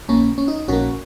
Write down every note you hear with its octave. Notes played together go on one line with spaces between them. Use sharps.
A#1 A#2 A#3 C#4
C#4
D#4
A#1 A#2 A#3 C#4 F#4